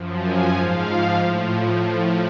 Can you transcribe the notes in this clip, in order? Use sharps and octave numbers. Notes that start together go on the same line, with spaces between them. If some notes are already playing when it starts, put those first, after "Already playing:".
Already playing: F#2 F3
G#5
G#2 F3 F5
A2 F3